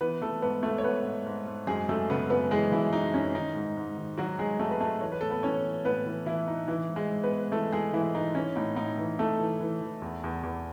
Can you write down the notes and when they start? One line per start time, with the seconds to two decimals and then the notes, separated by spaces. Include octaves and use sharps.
0.01 E3 B3 B4
0.22 E3 A3 A4
0.42 G#2 B3 B4
0.63 G#2 A3 A4
0.78 C#5
0.84 G#2 B3 B4
1.05 G#2
1.26 G#2
1.47 G#2
1.67 F#2 G#3 G#4
1.89 F#2 A3 A4
2.10 C#3 B3 B4
2.30 F#2 B3 B4
2.51 E3 G#3 G#4
2.71 F#2 E3 E4
2.93 F#2 D#4
3.14 F#2 C#4
3.35 D#3 D#4
3.55 G#2
3.77 G#2
3.97 D#3
4.18 D#3 F#3 F#4
4.39 G#2 G#3 G#4
4.60 G#2 A3 A4
4.71 B4
4.80 G#2 A3 A4
5.01 E3 C#5
5.12 B4
5.21 A2 A4
5.30 B3 B4
5.43 E3 C#4 C#5
5.64 E3
5.85 A2 B3 B4
6.06 E3
6.26 E3 E4
6.47 A2 D#4
6.68 E3 E4
6.89 G#2
6.96 G#3 G#4
7.11 G#2
7.24 B3 B4
7.30 G#2
7.52 E3 A3 A4
7.72 E3 G#3 G#4
7.93 G#2 E3 E4
8.15 E3 D#4
8.35 E3 C#4
8.56 A2 D#4
8.76 A2 D#4
8.98 E3
9.19 A2 A3 A4
9.40 E3
9.60 E3
9.81 E3
10.02 E2
10.24 E2
10.43 E2